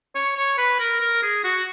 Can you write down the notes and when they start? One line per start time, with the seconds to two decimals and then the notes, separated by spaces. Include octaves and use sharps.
0.15 C#5
0.37 C#5
0.58 B4
0.79 A#4
1.01 A#4
1.22 G#4
1.44 F#4